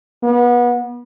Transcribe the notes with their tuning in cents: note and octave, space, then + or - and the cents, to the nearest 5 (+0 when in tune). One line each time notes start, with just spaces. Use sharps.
B3 -30